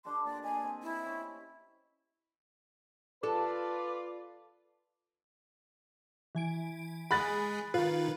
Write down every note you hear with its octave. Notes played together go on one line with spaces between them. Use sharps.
D4 G4 A4 C6
A#2 D5
D#5 G#5 B5
C4
E4
C#4
F4 A4 B4 D5
E3 G#5 D7
G#3 G#4 B5 F#6 A6
D#3 F4 B4